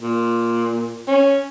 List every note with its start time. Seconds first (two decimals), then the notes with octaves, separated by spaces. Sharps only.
0.02 A#2
1.08 C#4